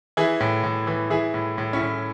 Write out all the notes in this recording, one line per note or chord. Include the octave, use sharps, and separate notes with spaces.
E3 E4 G#4
A2
A2
E3
E3 E4 G#4
A2
A2
C#4 E4
A2